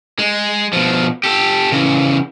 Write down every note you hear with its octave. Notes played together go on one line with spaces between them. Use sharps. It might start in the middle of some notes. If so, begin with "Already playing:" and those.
G#3
B2 F3
G4 A4
C#3 E3